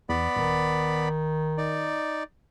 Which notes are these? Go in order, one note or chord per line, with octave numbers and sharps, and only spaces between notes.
E2 B3 D5 B5
D#1 D#3
D#4 D5